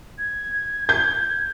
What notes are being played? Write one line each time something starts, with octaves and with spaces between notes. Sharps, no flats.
G#6
G6
G#6